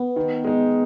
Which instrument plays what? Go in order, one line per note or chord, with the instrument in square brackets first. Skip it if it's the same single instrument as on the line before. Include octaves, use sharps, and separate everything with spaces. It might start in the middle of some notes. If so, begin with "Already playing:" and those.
Already playing: [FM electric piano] B3
[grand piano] D#3
G#3 D#4